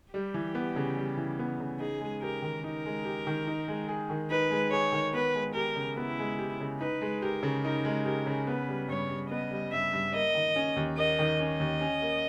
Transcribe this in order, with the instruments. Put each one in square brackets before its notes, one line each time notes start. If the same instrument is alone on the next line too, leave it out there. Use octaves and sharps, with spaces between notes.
[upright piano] G3 [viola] G4
[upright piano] E3
B3
C#3
G3
E3
B3
C#3
[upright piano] D#4 [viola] G#4
[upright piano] G#3
[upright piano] G4 [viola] A#4
[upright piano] D#3
[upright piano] D#4 [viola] A#4
[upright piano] G#3
G4
D#3
D#4
G#3
G#4
D#3
[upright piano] D#4 [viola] B4
[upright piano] G#3
[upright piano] G#4 [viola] C#5
[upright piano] D#3
[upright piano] B3 [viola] B4
[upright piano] G#3
[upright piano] G4 [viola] A#4
[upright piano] C#3
[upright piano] B3 [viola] E4
[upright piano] G#3
G4
C#3
[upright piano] D#4 [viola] B4
[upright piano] G#3
[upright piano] G4 [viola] A#4
[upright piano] C#3
[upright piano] D#4 [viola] A#4
[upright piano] G#3
[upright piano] G4 [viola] A#4
[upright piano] C#3
[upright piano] B3 [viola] B4
[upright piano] G3
[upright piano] G2 [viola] C#5
[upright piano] G2
[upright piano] B3 [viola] D#5
[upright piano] G3
[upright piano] G2 [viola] E5
[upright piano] G2
[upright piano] A#3 [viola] D#5
[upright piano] D#3
C#4
D#2
[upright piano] A#3 [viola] D#5
[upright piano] D#3
[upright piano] C#4 [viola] D#5
[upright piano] D#2
C#4
A#3